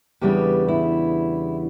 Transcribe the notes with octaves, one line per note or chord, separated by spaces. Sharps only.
E2 C#3 G3 B3 D4 G4
E4